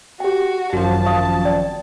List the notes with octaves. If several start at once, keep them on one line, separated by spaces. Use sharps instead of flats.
F#4 G4 G5
G#1 F#2 F3 F#4 A5
F5 C#6 D#6
D5 G5